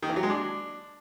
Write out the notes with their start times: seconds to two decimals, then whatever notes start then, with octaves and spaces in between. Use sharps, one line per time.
0.03 D#3
0.09 E3
0.16 F#3
0.23 G#3
0.30 D4